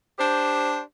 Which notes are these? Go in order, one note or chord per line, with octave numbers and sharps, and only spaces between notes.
D4 G4 C5